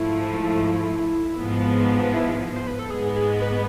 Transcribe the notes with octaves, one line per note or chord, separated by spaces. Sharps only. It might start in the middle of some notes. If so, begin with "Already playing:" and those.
Already playing: G#2 F3 A3 E4
G#1 G#2 F3 B3
E4
C5
B4
A4
G#2 G#3 B3 G#4
G#4
B4